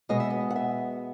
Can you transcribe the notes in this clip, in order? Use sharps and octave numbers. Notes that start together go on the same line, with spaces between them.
B2 G#3 B3 D#5
E5
D#5
F#5
E5